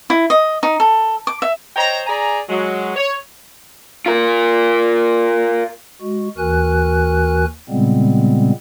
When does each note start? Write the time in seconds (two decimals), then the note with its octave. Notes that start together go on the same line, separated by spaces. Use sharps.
0.10 E4
0.30 D#5
0.63 D#4
0.80 A4
1.27 D6
1.42 E5
1.76 C5 C#5 D#5 G5 A#5
2.07 G#4 D5 G#5 A#5
2.49 F#3 G#3
2.96 C#5
4.06 F4 A#4
6.02 G#3 F#4
6.38 D#2 E3 F#4 A#4 G#5 F#6
7.69 A#2 C#3 G3 G#3 B3 C4